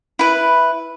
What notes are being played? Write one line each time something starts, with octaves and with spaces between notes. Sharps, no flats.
E4 B4